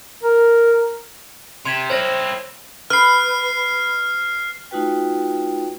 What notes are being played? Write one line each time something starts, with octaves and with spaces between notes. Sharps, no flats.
A#4
C3 C6 G#6 B6
C4 E4 C5 C#5 A#6
B4 F6 C7
A3 D#4 F4 F#4 B4 G5